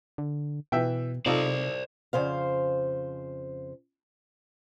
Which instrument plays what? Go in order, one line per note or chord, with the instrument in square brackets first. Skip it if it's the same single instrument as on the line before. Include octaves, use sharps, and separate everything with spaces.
[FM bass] D3
[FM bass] B2 [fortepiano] E3 E5 G5
[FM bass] C3 [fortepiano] D#4 F4 A4 [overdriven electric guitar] C5 D5
[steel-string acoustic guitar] F2 C#3 C5 F5